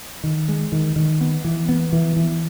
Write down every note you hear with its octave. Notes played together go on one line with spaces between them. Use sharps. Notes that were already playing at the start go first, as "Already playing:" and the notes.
D#3
G#3
D#3
D#3
B3
E3
B3
E3
E3